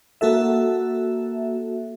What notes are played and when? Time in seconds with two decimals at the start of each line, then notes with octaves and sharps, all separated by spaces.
0.21 A#3 F#4 A4 E5